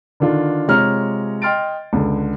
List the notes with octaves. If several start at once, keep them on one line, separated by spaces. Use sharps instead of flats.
D3 D#3 D4 F4
C3 G#3 F4 C#5 A#5 F6
D#5 G5 C6 F6 A6 D7
C#2 D3